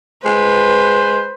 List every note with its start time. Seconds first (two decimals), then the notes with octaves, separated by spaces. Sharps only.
0.25 G#3 B4 C5